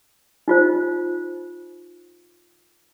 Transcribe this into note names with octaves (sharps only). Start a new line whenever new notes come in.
D#4 F4 C5